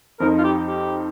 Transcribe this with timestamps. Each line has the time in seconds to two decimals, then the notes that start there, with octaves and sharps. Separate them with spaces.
0.20 F2 F3 D#4 A#4
0.38 F4
0.44 G4
0.68 G4